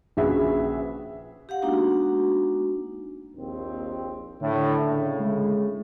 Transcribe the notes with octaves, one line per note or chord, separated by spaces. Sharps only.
A#1 C#3 F#4 G#4 B4 E5
G4 F5 F#5
G#3 A#3 B3 D4 D#4 F#4
A#1 D#2 C4
A2 D3
A2 C#3
G#3